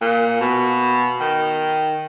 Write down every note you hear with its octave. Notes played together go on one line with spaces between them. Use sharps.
A#2
B2
D#3